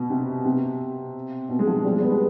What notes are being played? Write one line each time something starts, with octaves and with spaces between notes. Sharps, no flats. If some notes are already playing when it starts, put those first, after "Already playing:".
Already playing: B2
C3
C3
B2
G#3
F3
G3
G#3
B3
G#3